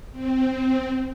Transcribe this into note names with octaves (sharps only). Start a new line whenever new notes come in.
C4